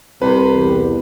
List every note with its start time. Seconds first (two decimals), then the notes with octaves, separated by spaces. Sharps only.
0.22 C2 C3 B4
0.53 E2